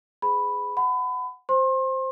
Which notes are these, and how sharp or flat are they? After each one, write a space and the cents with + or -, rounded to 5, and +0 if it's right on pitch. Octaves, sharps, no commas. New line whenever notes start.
G#4 +0 C5 -45 B5 +0
F#5 +0 B5 +30
C5 +0 C6 +35